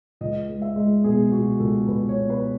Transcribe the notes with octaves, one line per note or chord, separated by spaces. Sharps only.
C#2 D#5
G#3
E5
G#3
B2 G#4
B2 F#4
C#2 A4
C#2 B4
C#5
B2
B4